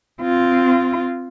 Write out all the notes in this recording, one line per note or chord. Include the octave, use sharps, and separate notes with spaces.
C4 F4